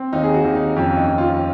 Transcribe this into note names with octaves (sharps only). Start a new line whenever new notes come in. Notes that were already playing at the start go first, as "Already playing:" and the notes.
Already playing: C4
D#2 D#4
G#4
F#4
D#2
D#4
F2 C#4
D#4
F2 D#4
F4